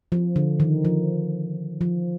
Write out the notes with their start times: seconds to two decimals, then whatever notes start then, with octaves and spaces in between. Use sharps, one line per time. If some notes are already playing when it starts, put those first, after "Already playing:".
0.12 F3
0.36 D3
0.60 D#3
0.85 F3
1.81 F3